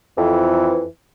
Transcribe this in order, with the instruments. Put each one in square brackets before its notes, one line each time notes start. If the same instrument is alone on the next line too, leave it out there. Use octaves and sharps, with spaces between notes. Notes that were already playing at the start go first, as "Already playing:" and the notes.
[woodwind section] F2 E3